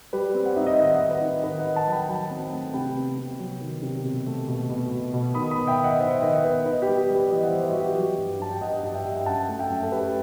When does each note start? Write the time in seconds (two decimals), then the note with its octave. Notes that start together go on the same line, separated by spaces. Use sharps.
0.13 G3 G4 B4
0.35 C4
0.45 F#5
0.56 D#4 E5
0.67 D#5 F#5
0.78 D#3 D#5 F#5
0.94 D#5 F#5
1.00 C4
1.11 B4 D#5
1.22 D#4
1.44 D#3 B4 D#5
1.59 D#5 F#5
1.65 D#3
1.76 F#5 A5
1.87 F#3
1.92 G5 B5
2.09 F#3 F#5 A5
2.31 C4
2.53 A3
2.74 C3 G5 B5
2.96 B3
3.18 C3
3.39 F#3
3.61 D#3
3.82 C3
4.04 B2
4.26 A3
4.48 B2
4.69 B2
4.91 B2
5.13 B2
5.34 D#3 B5 D#6
5.51 B5 D#6
5.57 B3
5.68 E5 G5
5.79 D#3
5.84 D#5 F#5
6.00 D#3 C5 E5
6.22 D#3 B4 D#5
6.44 B3 B4 D#5
6.65 D#4 B4 D#5
6.82 G4 B4
6.88 G3
6.99 G4
7.10 G3
7.15 G4 B4
7.31 E3 B4 D#5
7.43 F#5
7.47 C5 E5
7.52 G3
7.63 B4 D#5
7.72 E3 F#4
7.80 G4
7.96 F#3
8.18 G2
8.39 G2 A5
8.51 G5
8.61 G2 D#5 F#5
8.83 G2
8.94 E5 G5
9.05 G2
9.17 G5
9.26 F#2 F#5 A5
9.49 A3
9.59 E5 G5
9.70 F#2
9.83 A4
9.92 A3 G4 B4